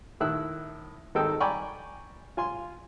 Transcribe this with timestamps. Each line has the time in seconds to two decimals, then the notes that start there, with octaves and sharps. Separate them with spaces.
0.20 A2 D#3 E4 E6 F#6
1.15 G#1 D#3 D#4 A4 G5 E6
1.40 D5 G5 G#5 A#5 B5 C#6
2.37 F4 G#5 C6